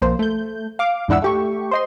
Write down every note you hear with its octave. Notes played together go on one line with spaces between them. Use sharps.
B1 F2 A#3 C5
A3 G6
F5 D6
E2 G#2 D4 E4 F#5 E6
A3 G4 C#6
C5 D#5 C6